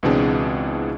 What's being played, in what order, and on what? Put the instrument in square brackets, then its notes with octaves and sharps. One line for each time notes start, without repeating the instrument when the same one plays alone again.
[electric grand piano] C#2 B2 E3 C4 D4 G#4